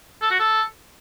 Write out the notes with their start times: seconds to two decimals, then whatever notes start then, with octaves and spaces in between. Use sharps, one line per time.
0.21 A4
0.30 F#4
0.39 A4